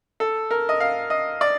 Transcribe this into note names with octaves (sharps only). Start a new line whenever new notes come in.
A4
A#4
D#5
F5
D#5
D5